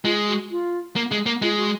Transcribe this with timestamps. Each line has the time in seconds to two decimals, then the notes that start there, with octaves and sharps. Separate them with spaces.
0.04 G#3 F4
0.28 F#4
0.51 F4
0.96 A#3
1.11 G#3
1.26 A#3
1.42 G#3 F4
1.57 F#4